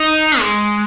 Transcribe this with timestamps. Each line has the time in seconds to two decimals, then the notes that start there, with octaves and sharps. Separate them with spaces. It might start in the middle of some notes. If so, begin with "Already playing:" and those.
Already playing: D#4
0.40 G#3